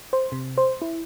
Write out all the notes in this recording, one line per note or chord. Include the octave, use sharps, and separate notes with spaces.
C5
C3
C5
E4